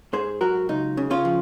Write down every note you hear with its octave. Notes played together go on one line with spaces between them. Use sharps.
G#2 G#4 C5
F#3 F#4 A#4
C#2 D#4
C#3
C#4 F4
F3